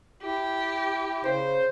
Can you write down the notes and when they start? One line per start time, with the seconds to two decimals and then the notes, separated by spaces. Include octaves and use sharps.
0.23 E4 G4
1.24 C#3 C5